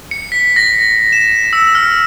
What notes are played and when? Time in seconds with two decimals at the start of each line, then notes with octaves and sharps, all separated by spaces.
0.11 C#7
0.32 B6
0.56 A#6
1.13 E7
1.53 E6
1.75 F6